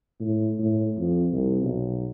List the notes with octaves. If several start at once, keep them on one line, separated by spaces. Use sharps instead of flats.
A2
A2
F2
C2
B1